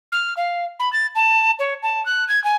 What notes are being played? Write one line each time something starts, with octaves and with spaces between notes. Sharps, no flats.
F6
F5
B5
A6
A5
C#5
A5
F#6
G#6
G#5